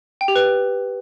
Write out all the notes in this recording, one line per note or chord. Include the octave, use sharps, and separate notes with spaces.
G5
G4
B4